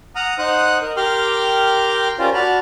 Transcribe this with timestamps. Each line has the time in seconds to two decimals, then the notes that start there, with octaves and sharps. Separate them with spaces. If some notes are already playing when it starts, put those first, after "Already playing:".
0.15 F#5 A#5 D#6 F6
0.38 D#4 C5 F#5 D#6 F#6
0.82 A#4 D#5
0.97 G4 A#4 G5 C6 D6 F6
2.19 C#4 F4 G4 A#4 C5 D5
2.34 F#4 D5 A5 B5 F6